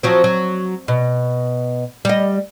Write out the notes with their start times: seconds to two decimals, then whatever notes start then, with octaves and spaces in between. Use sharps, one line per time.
0.03 F3 F#3 C4
0.24 F#3
0.88 B2
2.05 G3 D#5